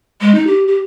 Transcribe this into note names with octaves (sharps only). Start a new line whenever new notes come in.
G#3
D#4
G4
G4